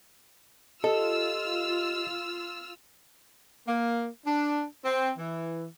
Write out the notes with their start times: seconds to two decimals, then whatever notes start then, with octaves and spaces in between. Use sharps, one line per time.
0.84 F4 G4 A4 D#5 E6 F6
3.67 A#3
4.26 D4
4.85 C4
5.18 E3